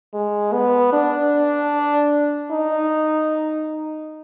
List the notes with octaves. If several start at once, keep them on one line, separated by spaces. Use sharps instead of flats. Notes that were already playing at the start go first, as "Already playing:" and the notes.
G#3
B3
D4
D#4